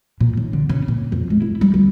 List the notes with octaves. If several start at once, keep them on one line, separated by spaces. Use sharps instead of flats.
A#2
D#2
D3
C#3
A#2
F2
G#3
E4
G3
D2